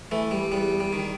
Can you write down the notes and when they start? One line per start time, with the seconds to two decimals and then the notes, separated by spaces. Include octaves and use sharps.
0.11 E3 A3
0.31 G3
0.52 E2 G3
0.80 G3
0.93 D#3